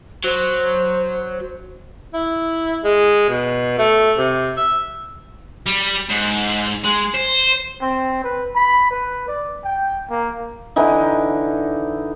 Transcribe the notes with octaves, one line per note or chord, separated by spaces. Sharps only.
F#3 C5
E4
G#3
B2
A3
C3
E5
G3
G#2
G#3
C5
C4
B4
B5
B4
D5
G5
A#3
D3 E3 D#4